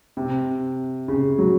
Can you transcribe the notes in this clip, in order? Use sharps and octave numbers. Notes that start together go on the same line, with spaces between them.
C3
C#3
F#3